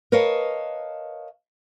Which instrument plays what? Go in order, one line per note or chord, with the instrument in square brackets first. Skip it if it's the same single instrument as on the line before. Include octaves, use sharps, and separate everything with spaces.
[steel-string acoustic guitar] A#4 B4 C#5 D#5 F5 A5